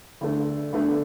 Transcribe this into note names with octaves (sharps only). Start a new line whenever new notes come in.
D2 D3 A3 D4
D2 D3 A3 D4